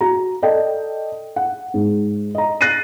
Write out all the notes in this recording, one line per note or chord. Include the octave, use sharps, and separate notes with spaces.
F#4 A#5
A4 D5 D#5 G5
F#5
G#2
D#5 A#5
F#6 A6 A#6 C7 D#7